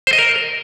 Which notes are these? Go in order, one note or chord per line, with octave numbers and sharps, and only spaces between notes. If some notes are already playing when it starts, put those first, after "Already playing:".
C5
D#5
A#4